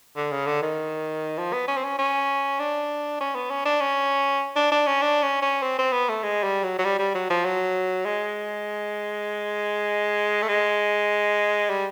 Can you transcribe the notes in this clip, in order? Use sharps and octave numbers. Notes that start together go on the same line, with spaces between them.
D3
C#3
D3
D#3
F3
B3
C#4
C4
C#4
C#4
D4
C#4
B3
C#4
D4
C#4
D4
D4
C#4
D4
C#4
C#4
C4
C4
B3
A3
G#3
G3
F#3
F#3
G3
G3
F#3
F3
F#3
G#3
A3
G#3
G3